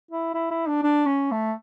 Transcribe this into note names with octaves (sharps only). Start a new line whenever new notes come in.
E4
E4
E4
D4
D4
C#4
A3